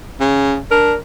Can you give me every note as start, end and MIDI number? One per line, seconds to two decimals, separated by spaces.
0.20 0.59 49
0.71 0.93 62
0.71 0.96 70